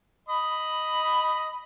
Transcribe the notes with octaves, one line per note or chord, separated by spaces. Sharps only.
D#5 B5